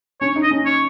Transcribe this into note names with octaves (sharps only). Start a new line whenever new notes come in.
C#4 C#5
D#4
D#5
C#4
C#5